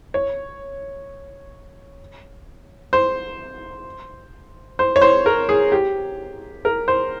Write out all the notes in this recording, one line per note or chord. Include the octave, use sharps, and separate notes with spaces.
C#5
C5
C5
C#5
C5
A#4
G#4
G4
A#4
C5